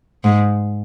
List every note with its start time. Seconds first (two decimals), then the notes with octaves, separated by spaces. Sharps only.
0.24 G#2